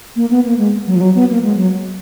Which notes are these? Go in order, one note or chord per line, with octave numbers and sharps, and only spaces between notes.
A#3
B3
A#3
G#3
F#3
F3
F#3
B3
A#3
G#3
F#3